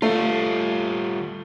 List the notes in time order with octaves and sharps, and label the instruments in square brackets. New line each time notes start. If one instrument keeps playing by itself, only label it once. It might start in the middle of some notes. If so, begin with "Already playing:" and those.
[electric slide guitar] G3 F4 [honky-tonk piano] A3